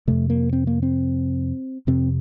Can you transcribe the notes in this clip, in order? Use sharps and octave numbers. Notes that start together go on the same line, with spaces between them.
F2 C3 A3
A#3
C4
A#3
C4
F2 C3 C4